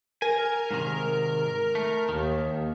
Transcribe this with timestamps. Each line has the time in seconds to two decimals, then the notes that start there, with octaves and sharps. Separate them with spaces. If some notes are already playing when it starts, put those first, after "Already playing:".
0.22 A#4 G#5
0.71 G#2 C3 D#3
1.75 A3
2.09 D#2 D#3